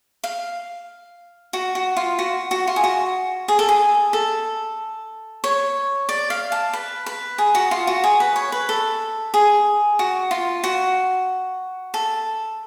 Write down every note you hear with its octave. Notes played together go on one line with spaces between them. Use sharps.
F5
F#4
F#4
F4
F#4
F#4
F4
G#4
F#4
G#4
A4
G#4
A4
C#5
D5
F5
A5
B4
B4
G#4
F#4
F4
F#4
G#4
B4
C#5
B4
A4
G#4
F#4
F4
F#4
A4